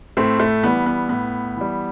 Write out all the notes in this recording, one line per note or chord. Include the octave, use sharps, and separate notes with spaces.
A2 A3 C4
A3
E3 G3 B3
B3
A2 B3
E3 G3